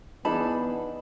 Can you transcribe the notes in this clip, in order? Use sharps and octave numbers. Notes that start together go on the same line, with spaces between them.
E3 B3 D4 D#4 G#4 A5 B5